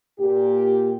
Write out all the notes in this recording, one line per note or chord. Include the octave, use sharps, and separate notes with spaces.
A#2 G4